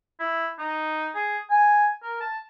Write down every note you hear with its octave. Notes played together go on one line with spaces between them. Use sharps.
E4
D#4
G#4
G#5
A#4
A5